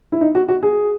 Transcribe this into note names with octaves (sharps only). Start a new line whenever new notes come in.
E4
D#4
F#4
F#4
G#4